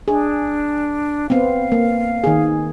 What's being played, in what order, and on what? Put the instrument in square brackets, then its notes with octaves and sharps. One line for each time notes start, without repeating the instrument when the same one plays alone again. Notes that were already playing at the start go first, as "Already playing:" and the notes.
[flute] D4 [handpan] G#4
[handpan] B3 C4 [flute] F5
[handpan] A#3
D#3 G#4